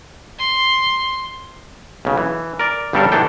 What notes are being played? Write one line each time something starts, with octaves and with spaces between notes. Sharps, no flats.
C6
B1 C#3
E3
A#4 D5
G1 C#3 G3 D4 A4 A#4
D#3 E3 D4 A4 G5